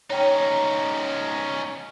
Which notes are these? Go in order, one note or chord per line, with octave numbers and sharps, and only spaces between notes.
C#4 D#4 C#5 G5 A#5